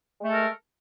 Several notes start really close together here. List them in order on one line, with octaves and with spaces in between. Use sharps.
G#3 A3 A4 A#4